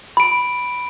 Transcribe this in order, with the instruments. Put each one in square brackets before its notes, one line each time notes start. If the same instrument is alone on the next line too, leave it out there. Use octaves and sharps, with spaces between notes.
[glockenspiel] B5 D7